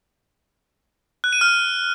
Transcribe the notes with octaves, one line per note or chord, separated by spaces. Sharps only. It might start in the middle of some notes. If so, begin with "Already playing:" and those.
F#6
D#7
F6